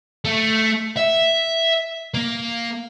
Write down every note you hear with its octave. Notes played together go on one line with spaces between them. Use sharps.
A3
E5
A#3